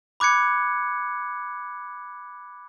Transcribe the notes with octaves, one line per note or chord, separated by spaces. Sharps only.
B5 D6 F#6 G#6 C#7